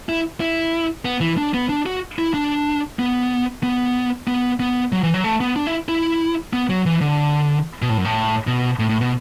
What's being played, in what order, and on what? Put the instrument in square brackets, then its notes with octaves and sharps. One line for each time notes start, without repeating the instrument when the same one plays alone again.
[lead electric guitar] E4
E4
B3
E3
D4
B3
D4
F#4
E4
D4
B3
B3
B3
B3
F#3
E3
F#3
A3
B3
D4
E4
E4
B3
F#3
E3
D3
B2
A2
F#2
A2
B2
A2
A2
B2